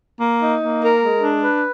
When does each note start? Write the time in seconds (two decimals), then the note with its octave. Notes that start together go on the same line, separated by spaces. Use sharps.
0.20 A#3
0.40 D#4
0.60 A#3
0.81 A#4
1.01 G#3
1.21 D4
1.42 B4